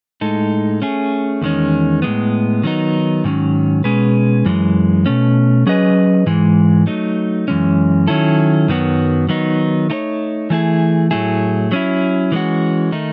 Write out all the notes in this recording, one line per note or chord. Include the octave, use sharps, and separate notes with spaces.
A2 G#3 D#4 A4
A3 C#4 G#4
E2 D#3 G#3 C#4
A2 G#3 B3
D#3 F#3 B3 D#4
G#2 D#3 F#3 C#4
B2 G#3 C#4 G#4 B4
F#2 E3 G#3
B2 A3 C#4
F#3 C#4 G#4 B4 D#5
G#2 E3 G#3
F#3 A3 D#4
F#2 E3 G#3 C#4
D#3 F#3 C#4 E4 A4
F#2 D#3 F#3 B3 F#4
D#3 F#3 B3 D#4
A3 D#4 A4 C#5
E3 A3 E4 G#4
A2 F#3 A3 E4 G#4
F#3 C#4 E4
E3 G#3 C#4 F#4
D#3 A3 D#4